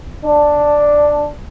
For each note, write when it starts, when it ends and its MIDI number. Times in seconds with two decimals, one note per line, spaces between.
0.24 1.26 62